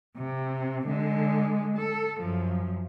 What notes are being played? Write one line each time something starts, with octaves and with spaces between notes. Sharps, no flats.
C3
D3 G#3
A4
F#2 F3